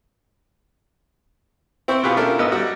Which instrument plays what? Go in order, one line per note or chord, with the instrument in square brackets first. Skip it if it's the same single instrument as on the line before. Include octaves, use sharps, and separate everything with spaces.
[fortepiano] C4 E4 G5 C#6
B2 B3 F4 G4 G#4 B4
C#4 D4 E4 F4 A4 A#4
G#1 B3 D#5 E6
G3 F#4